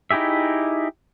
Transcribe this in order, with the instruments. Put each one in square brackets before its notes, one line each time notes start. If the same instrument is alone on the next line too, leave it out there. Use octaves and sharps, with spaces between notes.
[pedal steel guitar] D#4 E4 G4 G#4 E5